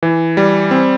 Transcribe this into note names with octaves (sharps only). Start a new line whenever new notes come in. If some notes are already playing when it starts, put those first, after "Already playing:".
E3
G3
C4